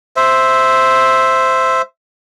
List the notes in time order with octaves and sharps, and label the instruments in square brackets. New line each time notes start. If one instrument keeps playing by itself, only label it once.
[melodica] C5 E5